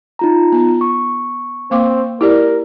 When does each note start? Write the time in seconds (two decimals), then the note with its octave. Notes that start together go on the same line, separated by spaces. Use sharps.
0.19 D#4 F4 A#5
0.52 B3
0.81 C#6
1.71 A#3 C4 F5 D6
2.21 E4 G4 A#4 D5